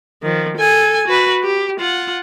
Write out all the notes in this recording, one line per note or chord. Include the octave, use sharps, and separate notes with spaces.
D#3 F3
A4 G#5
F#4 B4
G4
F4 F#5